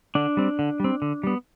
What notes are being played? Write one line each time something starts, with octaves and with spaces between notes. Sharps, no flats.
D3 D4
G3 C4
D3
G3 C4
D3
G3 B3